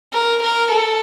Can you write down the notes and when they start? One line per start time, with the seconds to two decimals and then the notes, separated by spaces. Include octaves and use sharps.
0.13 A#4
0.43 A#4
0.72 A4